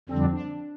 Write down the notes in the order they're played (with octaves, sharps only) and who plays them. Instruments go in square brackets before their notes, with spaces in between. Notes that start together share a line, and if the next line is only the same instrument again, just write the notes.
[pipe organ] F2 D3 G3 D4 [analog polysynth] C4
[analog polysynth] D4